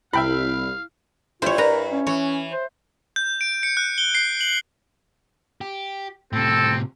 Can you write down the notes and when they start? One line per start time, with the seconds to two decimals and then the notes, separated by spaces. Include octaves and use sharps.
0.13 C2 E4 E5 F5 G5 B5
1.42 G2 E4 F4 C5 C#5
1.58 A#4 B4 A#5
1.92 C#4
2.07 E3 C#5
2.51 C5
3.16 G6
3.41 D7
3.63 C#7
3.77 F#6
3.98 G7
4.15 C7
4.41 F#7
5.61 G4
6.33 A2 C3 C4 A4